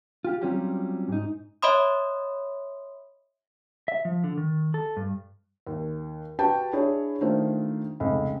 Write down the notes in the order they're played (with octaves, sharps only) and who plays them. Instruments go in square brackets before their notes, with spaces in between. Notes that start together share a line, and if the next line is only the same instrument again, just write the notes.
[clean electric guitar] F4 G4
F#3 G3 C4 C#4 F4 G4
G#2 D#4
[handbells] C#5 D#5 E5 B5 C6 D#6
[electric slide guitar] E5
F3
D3
D#3
A4
G2
[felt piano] D#2
F#4 G4 B4 G5 A5
D4 E4 G#4 C#5
D#3 A3 D4 F4 C5
F1 C#2